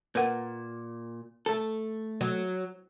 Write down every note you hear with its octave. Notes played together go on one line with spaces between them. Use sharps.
A#2 A#4 B4 F#5
A3 A4
F#3